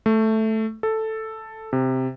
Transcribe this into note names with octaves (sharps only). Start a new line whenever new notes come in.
A3
A4
C3